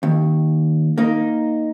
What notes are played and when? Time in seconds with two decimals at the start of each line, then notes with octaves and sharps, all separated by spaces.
0.03 D#2
0.98 A#3 D#4